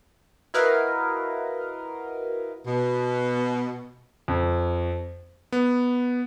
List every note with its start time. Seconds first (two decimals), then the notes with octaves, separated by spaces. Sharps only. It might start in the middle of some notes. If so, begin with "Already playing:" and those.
0.54 E4 F#4 A#4 B4 D#5 F5
2.67 B2
4.28 F2
5.52 B3